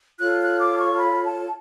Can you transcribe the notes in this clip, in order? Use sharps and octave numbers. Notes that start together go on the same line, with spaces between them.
F4 A4 C#5 F#6
F#6
D6
C#6
B5
A5